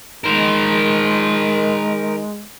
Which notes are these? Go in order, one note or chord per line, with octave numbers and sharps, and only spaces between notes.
D#3 G#3 A#4 C5